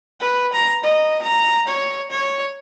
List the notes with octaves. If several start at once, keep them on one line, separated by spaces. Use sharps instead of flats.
B4
A#5
D#5
A#5
C#5
C#5